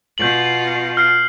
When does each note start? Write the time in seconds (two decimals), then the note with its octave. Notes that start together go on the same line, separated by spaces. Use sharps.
0.18 B2 F4 G6 F#7
0.97 F6 C7